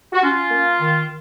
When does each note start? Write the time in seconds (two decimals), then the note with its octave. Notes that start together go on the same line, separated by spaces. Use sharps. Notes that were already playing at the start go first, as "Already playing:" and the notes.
0.12 F#4
0.22 C#4 F4
0.51 A#3
0.79 D#3